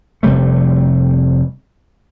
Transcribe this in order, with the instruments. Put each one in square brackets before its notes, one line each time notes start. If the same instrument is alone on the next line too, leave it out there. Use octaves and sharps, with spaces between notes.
[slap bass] F1 C3 G3 A3